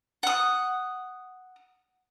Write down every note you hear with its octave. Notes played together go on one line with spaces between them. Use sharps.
F#5 D#6